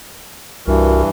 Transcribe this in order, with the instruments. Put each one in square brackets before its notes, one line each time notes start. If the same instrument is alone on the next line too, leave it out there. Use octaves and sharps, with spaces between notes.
[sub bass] C2 [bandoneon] G2 E3 [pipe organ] F#4 A#4